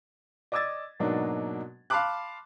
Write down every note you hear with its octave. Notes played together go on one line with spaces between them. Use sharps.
D5 D#5 D6 E6 G#6 A6
G#2 B2 F#3 A#3 D4 D#4
F5 A5 B5 C6 D6 F#6